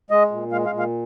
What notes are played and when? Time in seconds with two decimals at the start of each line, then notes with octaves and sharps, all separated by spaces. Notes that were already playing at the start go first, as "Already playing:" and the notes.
0.11 G#3 D#5
0.31 A#2
0.51 G#3 F5
0.66 F5
0.72 A#2
0.79 F5